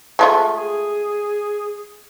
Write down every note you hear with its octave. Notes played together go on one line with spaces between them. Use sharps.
G#3 A3 F4
G#4